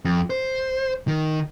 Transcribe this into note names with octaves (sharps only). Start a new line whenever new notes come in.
F2
C5
D#3